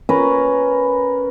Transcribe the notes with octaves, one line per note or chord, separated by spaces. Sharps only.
C#4 A#4 B4